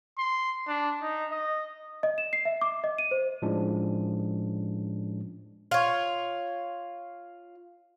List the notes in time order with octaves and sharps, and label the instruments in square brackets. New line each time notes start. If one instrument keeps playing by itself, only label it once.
[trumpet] C6
D4
D#4
D#5
[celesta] D#5
E7
C7
E5
D6
D#5
D#7
C5
[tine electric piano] A2 F3 G#3 C#4 D4
[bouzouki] F4 C#5